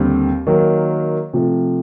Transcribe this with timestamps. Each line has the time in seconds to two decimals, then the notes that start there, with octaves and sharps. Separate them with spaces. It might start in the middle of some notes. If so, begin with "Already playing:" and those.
Already playing: D#2 D3 G3 C4
0.47 D#3 F#3 A#3
1.33 C3 F3 A3